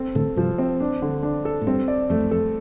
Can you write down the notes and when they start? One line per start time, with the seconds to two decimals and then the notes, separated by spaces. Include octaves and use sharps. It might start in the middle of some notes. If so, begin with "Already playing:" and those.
Already playing: C4 A4
0.15 A2 D3 A4
0.36 G2 C3 F3
0.58 C4
0.80 D4
1.02 D3
1.23 D4
1.45 A4
1.61 A2
1.67 G2 C4
1.88 D5
2.10 F2 A3
2.20 F2
2.31 F2 A4